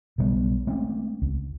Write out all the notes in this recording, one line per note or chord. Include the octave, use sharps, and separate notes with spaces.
B1 C#3 G3 B3
G#3 A3 C4 C#4
C#2